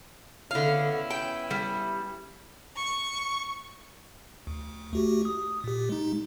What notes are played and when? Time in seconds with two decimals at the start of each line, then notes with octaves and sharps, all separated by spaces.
0.51 D3 B3 C#4 E4 F5
1.10 G5
1.51 G3
2.77 C#6
4.47 D2
4.93 A3 F#4 G4
5.25 D#6
5.64 A#2 G4
5.89 G#3 D#4